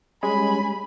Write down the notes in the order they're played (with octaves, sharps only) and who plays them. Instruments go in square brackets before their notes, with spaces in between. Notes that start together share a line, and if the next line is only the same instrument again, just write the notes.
[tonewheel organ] G3 C#4 [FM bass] G#3 [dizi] G#5 [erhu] B5